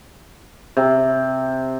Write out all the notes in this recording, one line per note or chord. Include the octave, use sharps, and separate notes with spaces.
C3